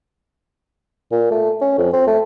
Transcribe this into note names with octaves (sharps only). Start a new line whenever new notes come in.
A#2
A3
C#4
F2
C4
A3